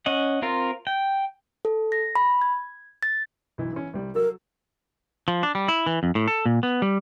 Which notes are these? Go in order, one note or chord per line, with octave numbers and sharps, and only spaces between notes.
C#4 D#5 F#5
C4 F4 A#4
G5
A4
A#6
B5
G#6
A6
B1 E3
E3 C#4
C2 G3
F#3 A4 A#4 E6
F3
D4
G3
E4
E3
F2
A2
A4
A#2
B3
G3